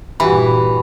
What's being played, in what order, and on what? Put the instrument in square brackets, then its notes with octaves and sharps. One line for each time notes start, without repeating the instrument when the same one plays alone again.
[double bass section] G2 A#2 [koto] E3 [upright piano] F#4 G4 [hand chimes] B5